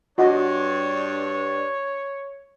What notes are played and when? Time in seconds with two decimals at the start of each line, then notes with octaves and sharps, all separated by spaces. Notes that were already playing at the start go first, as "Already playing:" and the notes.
0.18 G2 D4 F#4 C#5 D#5